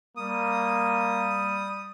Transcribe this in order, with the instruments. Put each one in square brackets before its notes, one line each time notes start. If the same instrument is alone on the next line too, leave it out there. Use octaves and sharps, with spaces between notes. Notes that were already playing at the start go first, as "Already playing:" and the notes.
[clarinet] G3 [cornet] A#3 [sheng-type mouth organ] D#6